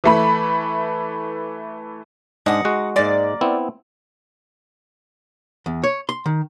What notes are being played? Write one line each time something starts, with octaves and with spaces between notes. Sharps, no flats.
E3 A3 B5
G#2 G#3 D4 D#4 F#5
G#3 F#4
G#2 G#3 A#3 D5
B3 C4 E4
E2
C#5
C6
D#3